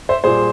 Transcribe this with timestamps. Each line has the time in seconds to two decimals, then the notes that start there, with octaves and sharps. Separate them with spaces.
0.09 C5 E5
0.24 A#2 G3 G#4 C5